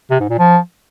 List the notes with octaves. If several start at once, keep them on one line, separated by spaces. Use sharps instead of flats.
C3
G#2
A#2
F3